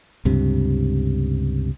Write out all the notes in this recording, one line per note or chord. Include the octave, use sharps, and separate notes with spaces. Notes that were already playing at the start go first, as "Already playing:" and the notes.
C#2 G2 C3